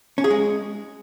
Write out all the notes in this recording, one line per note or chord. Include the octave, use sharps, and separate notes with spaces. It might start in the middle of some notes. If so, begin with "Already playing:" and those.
C#4
G#4
G#3